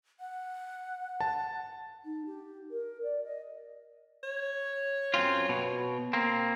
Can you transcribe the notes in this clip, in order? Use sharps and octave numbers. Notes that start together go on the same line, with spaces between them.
F#5
A5
D#4
G4
A#4
D5
D#5
C#5
F#2 C4 F4
B2
A#3 C4